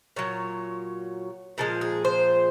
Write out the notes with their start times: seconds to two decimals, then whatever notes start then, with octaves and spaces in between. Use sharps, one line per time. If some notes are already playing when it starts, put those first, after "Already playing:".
0.16 A#2 F#3 C#5
1.58 A#2 F3 G#3 A#4
1.81 G#4
2.05 C5